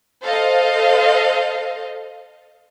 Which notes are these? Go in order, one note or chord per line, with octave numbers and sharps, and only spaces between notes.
A4 C5 D#5 F5